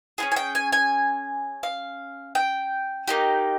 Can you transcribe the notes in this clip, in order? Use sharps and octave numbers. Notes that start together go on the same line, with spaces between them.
C#4 F4 G#4 G#5
G#5
G5
G#5
G#5
F5
G5
A#3 D#4 G4